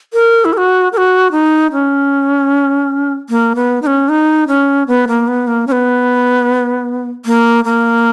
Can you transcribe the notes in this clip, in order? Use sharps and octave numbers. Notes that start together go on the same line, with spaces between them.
A#4
E4
A#4
F#4
A#4
F#4
D#4
C#4
A#3
B3
D#4
C#4
D#4
C#4
B3
A#3
B3
A#3
C#4
B3
A#3
A#3